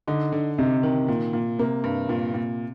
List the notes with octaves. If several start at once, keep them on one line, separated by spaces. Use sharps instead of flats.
D3 D#4
D3
C3 D#4
D#3
A#2
A#2
C3 A#3
G2
A#2
A#2